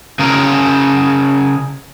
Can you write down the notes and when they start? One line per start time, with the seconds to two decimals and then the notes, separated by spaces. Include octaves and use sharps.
0.19 C#3 G#4 A#4